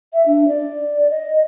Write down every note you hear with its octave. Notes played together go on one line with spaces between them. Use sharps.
E5
D4
D5
D#5